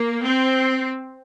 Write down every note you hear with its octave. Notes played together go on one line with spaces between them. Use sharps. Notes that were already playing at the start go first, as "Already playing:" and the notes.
Already playing: A#3
C4